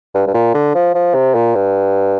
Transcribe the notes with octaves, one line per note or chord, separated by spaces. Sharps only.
G2
G2
A#2
D3
F3
F3
C3
A#2
G2